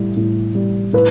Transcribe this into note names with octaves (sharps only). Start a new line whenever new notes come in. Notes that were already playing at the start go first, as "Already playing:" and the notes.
Already playing: A2 G3
A2
G3
A2 B4